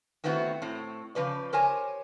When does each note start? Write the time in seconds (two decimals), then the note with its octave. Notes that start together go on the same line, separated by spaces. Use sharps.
0.24 D#3 A3 B3 C4 E4 F#4
0.62 A2 C4
1.15 C#3 F3 B4 D5
1.53 G4 A#4 C5 C#5 G#5